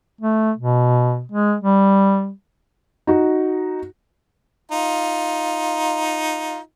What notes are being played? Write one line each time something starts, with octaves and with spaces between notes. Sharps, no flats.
A3
B2
G#3
G3
D#4 F#4
D#4 F4